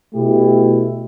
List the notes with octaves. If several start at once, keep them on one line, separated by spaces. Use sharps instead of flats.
B2 A3 E4 G4